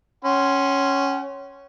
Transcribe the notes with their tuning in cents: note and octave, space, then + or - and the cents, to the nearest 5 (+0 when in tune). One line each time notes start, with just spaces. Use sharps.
C#4 +0 F#5 +45 C6 +0